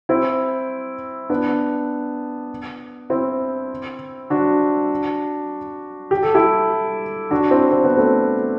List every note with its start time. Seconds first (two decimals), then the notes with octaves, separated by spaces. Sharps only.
0.09 C4 E4
1.30 B3 D4
3.10 C4 E4
4.30 D4 F#4
6.11 G4
6.23 A4
6.34 E4 G4
7.31 D4 F#4
7.51 C4 E4
7.71 C4
7.84 B3
7.97 A3 C4